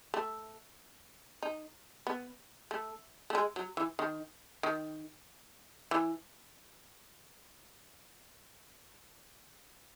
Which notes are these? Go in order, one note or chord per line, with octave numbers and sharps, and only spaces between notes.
A3
D#4
B3
A3
A3
G#3
F#3
E3
D#3
D#3
E3